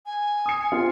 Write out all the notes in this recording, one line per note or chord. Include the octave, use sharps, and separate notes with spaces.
G#5
D#6 C#7
C4 F4